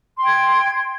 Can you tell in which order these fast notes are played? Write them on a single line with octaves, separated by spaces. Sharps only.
C6 G5 G#6